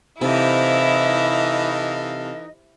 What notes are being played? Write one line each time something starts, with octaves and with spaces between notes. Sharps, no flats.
C3 E3 D#4 E4 A4 D5 D#5 F5